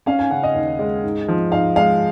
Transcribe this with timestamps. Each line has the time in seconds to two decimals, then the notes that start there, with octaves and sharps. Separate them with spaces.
0.06 C#4 F5
0.19 G#5
0.31 C#3 F#5
0.43 D#5
0.55 D#2
0.79 G#3
1.03 G#2
1.28 F3
1.52 G#2 F5
1.76 G#3 F5